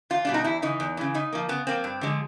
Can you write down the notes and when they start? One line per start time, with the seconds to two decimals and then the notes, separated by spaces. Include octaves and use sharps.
0.10 E2 F4
0.25 B2 G3 D4
0.34 D#4
0.44 E2 E4
0.62 C#3 E3 D#4
0.80 E2
0.97 C#3 E3
1.14 C#3 D#4
1.33 F3 A#3
1.49 C#3 B3
1.67 F3 A#3 C4
1.84 G2
2.01 D3 F3 G#3